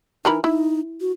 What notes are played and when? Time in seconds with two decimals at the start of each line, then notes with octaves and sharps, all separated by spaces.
0.25 E3 D#4 A#4 B5
0.44 D#4 E4
1.01 F#4